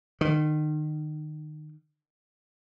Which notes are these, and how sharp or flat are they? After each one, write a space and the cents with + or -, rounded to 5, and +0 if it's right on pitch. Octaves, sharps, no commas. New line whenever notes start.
D#3 -30